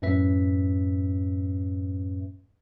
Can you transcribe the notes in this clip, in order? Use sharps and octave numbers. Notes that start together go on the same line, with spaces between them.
F#2 A2 C#4 B4 E5 B6